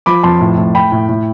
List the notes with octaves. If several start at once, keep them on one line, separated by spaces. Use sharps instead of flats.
F3 B5 D6
F2 A5 C6
A2
A2
A2 G5 B5
A2
A2